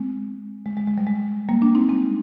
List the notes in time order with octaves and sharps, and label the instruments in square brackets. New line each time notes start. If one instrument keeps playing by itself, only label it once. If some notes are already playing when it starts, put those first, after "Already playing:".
Already playing: [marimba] G#3 C4
G#3
G#3
G#3
G3
G#3
G3 A#3
A#3 D4
C4 D#4
G#3 C4